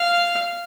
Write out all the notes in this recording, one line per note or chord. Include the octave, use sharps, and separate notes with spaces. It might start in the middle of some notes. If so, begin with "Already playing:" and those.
Already playing: F5